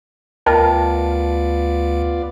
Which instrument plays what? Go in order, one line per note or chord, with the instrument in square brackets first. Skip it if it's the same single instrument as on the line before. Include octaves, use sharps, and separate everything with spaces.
[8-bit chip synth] D2 [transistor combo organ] B3 F4 D5 [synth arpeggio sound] A#4 [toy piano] D#5 G5 A5